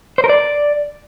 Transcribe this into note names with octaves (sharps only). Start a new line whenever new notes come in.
C5
A#4
D5